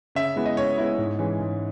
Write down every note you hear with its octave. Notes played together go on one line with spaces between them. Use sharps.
C#3 E5
G#3 B3 E4
D#5
C#3 C#5
G#3 B3 E4
G#2
E3 G#3 C#4
G#2